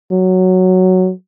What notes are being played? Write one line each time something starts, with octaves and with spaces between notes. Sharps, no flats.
F#3